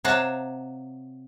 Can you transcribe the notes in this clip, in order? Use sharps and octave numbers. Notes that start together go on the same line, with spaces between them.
C3 C#5 F5 F#5 A5 A#5